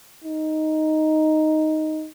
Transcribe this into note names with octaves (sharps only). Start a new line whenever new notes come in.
D#4